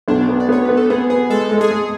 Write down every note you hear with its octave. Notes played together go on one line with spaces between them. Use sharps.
B1 D4
B3
D5
B3 C#5
B3 B4
A4
B3 G#4
B3 G#4
G#3 A4
G#3
G#4
G#3